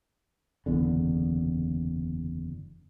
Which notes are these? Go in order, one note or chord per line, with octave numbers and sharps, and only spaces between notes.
F#1 E2 D3